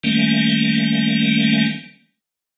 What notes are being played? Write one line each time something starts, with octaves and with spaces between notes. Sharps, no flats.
D#3 G3 A3 A#3 C#4